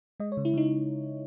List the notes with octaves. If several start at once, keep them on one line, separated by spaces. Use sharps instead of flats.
G#3 D#5
C#5
C#3
E4
C#3 D#4